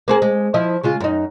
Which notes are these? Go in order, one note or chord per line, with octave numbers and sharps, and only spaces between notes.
A#3 C4 G#4
G#3
F3 E4 D#5
C#3 G#3 F4
F#2 D#4